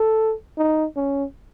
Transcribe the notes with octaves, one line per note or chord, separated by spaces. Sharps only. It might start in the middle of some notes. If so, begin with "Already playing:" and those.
Already playing: A4
D#4
C#4